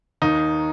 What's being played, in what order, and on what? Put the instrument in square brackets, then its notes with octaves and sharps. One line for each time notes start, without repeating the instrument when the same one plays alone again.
[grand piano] D#2 D#3 D#4